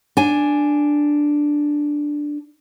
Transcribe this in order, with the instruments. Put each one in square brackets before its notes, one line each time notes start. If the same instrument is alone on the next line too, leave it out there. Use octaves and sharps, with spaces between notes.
[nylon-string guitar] D4 G#5